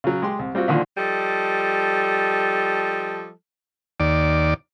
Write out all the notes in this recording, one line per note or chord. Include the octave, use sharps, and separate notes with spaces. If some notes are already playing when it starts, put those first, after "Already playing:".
C#3 F#3
G#3 G4 C6
C2
G3 C4 F4 F#4
A#2 D3 D#3 F3
F3 G3 A4 D#5
D#2 D5